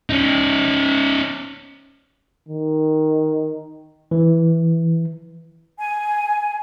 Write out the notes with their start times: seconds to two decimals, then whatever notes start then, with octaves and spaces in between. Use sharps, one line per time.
0.10 C#4 D#4
2.49 D#3
4.11 E3
5.79 G#5